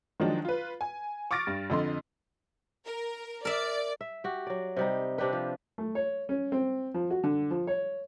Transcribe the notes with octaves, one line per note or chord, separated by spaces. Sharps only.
D#3 F3 F#3 G#3 D4 D#4
F4 B4
G#5
C#6 D6 F6 A6 A#6 D7
G2
F2 D3 D#5 C6
A#4
A#4 D5 E5
E5
F#4 G4
F#3 D5
C3 G3 D#4
C3 D4 G4 B4
F3
A3
C#5
C#4
C4
F3
F#4
D3
F3
C#5